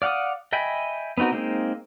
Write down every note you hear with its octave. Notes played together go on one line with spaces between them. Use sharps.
D5 F5 F#5 D6 D#6
D#5 E5 G5 G#5 B5
B3 C4 D#4 F#4 A#4
G#3 A#3 C4 D#4